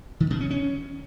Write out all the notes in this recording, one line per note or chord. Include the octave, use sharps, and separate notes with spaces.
D#3
B2
C#4
C#4